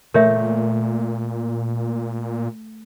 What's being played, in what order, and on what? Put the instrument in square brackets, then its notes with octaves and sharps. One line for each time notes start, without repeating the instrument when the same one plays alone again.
[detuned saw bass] A#2 [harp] A3 [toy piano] A#4 C#5 E5